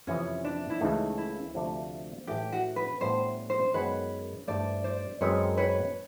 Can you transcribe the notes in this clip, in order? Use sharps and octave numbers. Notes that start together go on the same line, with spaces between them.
F2 C3 E3 C#4
D4
E4
C#2 C#3 E3 A3 D#4
E4
D2 C3 F3 A3 D4
A2 E3 A3 G4
F#4
B4
A2 E3 G3 B3 D4 C5
C5
F#2 D#3 G#3 B3 B4 C#5
G2 E3 A3 C5 D5
C5 D5
F#2 D#3 G#3 C4 D#4 B4 C#5
B4 C#5